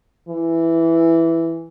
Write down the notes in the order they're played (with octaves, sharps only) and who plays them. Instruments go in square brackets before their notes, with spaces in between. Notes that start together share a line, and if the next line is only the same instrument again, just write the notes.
[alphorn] E3